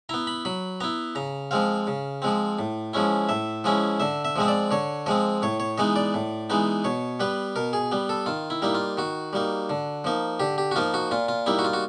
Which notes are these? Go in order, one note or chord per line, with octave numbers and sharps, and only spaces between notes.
B3 E4 A#5
B5
F#3 B5
B3 E4 A#5
C#3 A#5
F3 G#3 C4 F5
C#3
F3 G#3 C4
A2
F3 G#3 C#4 E4
A2 E5
F3 G#3 C#4 E4 D#5
D3 E5
E5
F3 G#3 C4 D#5
D5
D3 C#5
F3 G#3 C4 D#5
A2 C#5
C#5
E3 G#3 B3 D#4 D#5
D5
A2
E3 G#3 B3 D#4
B2 C#5
G3 B3 B4
B2 A#4
G#4
G3 B3
A4
D#3 F4
E4
G3 A#3 D#4 E4
F4
D#3 F#4
G3 A#3 D#4
D3
F3 A#3 D#4
D3 G4
G4
F#4
F3 A#3 D#4 F4
F#4
A#2 F4
F4
G3 A#3 D#4 E4
F#4
F4
F#4